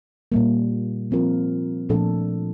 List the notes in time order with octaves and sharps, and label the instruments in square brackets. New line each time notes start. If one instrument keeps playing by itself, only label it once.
[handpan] A#2 G3 A#3
F3 C4 F4 A#4
A#2 F3 A3 D4 A4